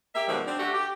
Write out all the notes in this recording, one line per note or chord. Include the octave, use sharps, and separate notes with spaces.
A#3 G4 E5
B2 D#3 F3 G3 G#3
C4 D4
D3 A3 F#4 G4
G4